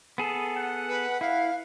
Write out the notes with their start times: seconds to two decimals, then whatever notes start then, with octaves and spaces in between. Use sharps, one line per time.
0.18 B3 G#4 A4
0.57 F#5
0.88 B4
1.21 E4 F5